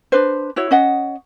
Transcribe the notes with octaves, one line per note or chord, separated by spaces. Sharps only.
D4 B4 C5
E4 F#4 C#5
C#4 D#5 F#5